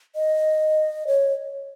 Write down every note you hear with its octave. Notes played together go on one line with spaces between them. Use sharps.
D#5
C#5